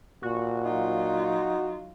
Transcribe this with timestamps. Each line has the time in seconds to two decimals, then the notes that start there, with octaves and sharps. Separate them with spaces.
0.23 A#2 F#4
0.65 F#3 D#4 F4